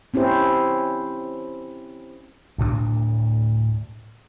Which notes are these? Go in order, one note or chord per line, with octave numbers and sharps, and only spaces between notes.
C4 C#4 E4 G4 C5
D2 A2 D4